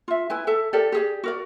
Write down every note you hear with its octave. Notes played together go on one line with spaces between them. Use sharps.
F4 E5
E4 B4 G#5
A4 E5 A5
G4 A4 A#4 D5
G4 G#4 D5
F#4 A#4 D5